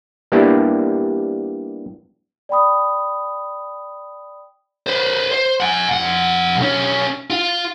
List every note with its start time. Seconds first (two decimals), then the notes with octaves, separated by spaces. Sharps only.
0.32 G3 A#3 B3 D4 E4 G4
2.49 D5 G5 B5 D#6
4.87 B4 C5
5.31 C5
5.60 F#5 G#5
5.92 F2 F#5
6.58 B1 C#4
7.30 F4